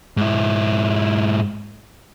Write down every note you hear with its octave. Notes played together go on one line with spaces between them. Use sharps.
G#2 E4